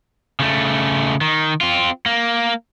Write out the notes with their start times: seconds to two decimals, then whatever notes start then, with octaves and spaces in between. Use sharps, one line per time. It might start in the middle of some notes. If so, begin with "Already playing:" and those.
0.40 C#3 A3
1.21 D#3
1.61 C4 F4
2.06 A#3